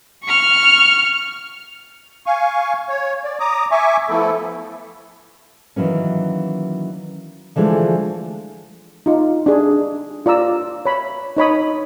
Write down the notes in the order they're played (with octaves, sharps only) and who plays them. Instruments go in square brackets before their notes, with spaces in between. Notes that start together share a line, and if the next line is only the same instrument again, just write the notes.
[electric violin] C#6 F6
[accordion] F5 G#5 C#6
C#5
D5
A#5 D6 D#6
E5 G#5 C#6 D6
F3 A3 B3 E4 A4
[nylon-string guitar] D#3 E3 F#3 A#3 C#4
D3 E3 F3 G#3 A3
[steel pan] D#4 F4
D4 G#4
F4 D5 A#5 E6
C#5 B5
D#4 C#5 B5 D#6